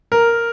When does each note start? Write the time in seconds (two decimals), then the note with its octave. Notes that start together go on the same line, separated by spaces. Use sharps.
0.12 A#4